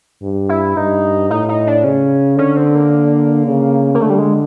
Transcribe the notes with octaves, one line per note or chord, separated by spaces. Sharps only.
G2
E4
G2 D#4
A2 D#4
D#4
D4
C#3 C#4
D3 C#4
C4
A#3
C#3
A#3
D3 A3
G3
G#3